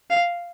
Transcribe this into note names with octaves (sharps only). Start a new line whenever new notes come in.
F5